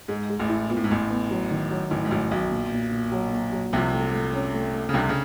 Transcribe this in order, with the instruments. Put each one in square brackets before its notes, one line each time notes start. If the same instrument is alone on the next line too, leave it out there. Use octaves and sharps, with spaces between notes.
[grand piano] G#2 [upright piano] G#3
[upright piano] G#3
[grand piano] A1 A2
[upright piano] E4
[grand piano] A#2 [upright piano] B3
[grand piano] A2
G#2
[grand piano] A1 A2 [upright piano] B3
[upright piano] B3
F#3
D#3
F#3
[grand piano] A1 A2 [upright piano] D#3
[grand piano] G#2
[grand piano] A1 A2 [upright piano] F#3
[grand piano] B1 B2 [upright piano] F#3
[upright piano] A#2
A#2
A#2
F#3
A#3
F#3
[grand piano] C2 C3 [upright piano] F3
[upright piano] A3
A3
C#4
A3
A3
[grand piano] C#3
[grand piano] C2 C3 [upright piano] D4
[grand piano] C#3